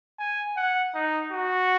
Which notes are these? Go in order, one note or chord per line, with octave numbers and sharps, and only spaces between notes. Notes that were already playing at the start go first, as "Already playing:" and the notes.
G#5
F#5
D#4
F#4